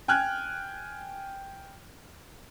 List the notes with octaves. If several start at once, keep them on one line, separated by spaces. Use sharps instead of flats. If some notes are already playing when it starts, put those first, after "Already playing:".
G5 G#5 F6 F#6 G#6